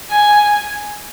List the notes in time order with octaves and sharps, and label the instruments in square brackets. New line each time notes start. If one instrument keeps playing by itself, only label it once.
[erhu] G#5